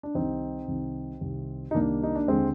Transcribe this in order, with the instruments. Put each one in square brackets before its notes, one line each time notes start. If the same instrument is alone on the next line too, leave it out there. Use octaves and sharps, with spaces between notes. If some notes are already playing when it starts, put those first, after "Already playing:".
[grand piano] D4
C2 C3 D#3 C4 D#4
C2 C3 D#3
C2 C3 D#3
D#4
C2 C3 D#3 A#3 D4
D#4
D4
D#2 D3 G#3 C4